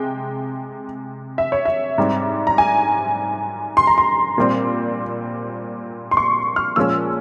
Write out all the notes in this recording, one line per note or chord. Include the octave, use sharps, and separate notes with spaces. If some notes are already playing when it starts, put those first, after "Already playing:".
Already playing: C3 G#3 G5
E5
C#5
E5
G#2 G3 C4
A#5
G#5
C6
A#5
C6
A#2 G3 C4
C6
C#6
F6
A#2 F3 G#3 C#4 E6